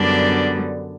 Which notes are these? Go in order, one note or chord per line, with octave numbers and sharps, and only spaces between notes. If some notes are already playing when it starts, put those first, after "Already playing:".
Already playing: F#2 D3 G3 B3 D4 D5